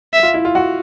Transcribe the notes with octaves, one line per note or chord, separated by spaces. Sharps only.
E5
F4
E4
F4
F#4